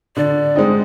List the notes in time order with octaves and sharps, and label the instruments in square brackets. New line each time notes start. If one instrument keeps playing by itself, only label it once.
[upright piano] D3 [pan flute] D5
[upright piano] G#3 C4 D#4